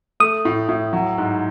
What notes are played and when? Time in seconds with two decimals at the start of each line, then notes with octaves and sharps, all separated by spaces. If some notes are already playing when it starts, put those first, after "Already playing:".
0.20 A3 D#6
0.45 A2
0.68 A2
0.93 F#3
1.18 G#2